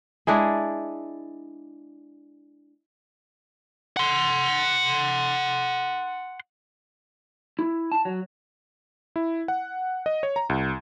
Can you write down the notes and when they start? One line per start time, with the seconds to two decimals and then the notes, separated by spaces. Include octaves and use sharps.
0.27 G#3 D4 E4 G#4
3.97 F#5 C6
7.59 E4
7.92 A5
8.05 F#3
9.16 E4
9.48 F#5
10.06 D#5
10.23 C#5
10.36 A#5
10.49 C2